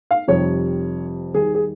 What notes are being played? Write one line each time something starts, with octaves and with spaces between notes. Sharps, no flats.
F5
F1 F2 C3 G3 C#5
D#2 D#3 G3 G#4
G#4